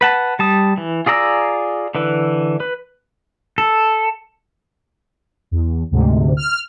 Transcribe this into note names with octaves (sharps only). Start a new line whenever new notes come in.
B4 F#5 A5
G3 A5 D#6
E3
F4 G#4 D5 A#5 E6
D3 E3 B4
B4
A4
E2
D2 G#2 C3
F6